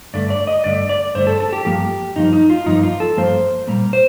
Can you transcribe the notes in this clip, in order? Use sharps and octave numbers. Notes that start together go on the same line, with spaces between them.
G2 D3 A3 D5
D5
D#5
G2 D3 A3 D5
D5
G2 D3 A3 C5
A4
A4
G4
G2 F3 A#3 G4
G2 F3 A#3 D#4
D#4
F4
G2 F3 A#3 D#4
F4
A4
G2 F3 A#3 C5
A#2 G3 A#3
C5